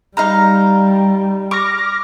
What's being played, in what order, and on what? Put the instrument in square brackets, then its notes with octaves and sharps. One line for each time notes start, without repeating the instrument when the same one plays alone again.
[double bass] G3 [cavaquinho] D#4 F5 A#5
[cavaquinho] C#6 [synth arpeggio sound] D6 F6 A#6